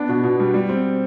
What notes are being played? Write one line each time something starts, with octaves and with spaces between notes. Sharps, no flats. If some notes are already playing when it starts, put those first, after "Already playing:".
Already playing: B3 D4
B2
B2
G3
G3
C4